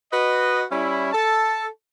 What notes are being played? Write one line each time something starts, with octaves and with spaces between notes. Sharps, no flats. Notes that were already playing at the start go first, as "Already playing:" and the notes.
F#4 B4 D#5
G3 C#4 E4
A4 A5